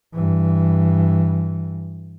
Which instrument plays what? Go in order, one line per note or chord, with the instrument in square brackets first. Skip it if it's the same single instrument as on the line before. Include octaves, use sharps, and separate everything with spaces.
[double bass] G2 E3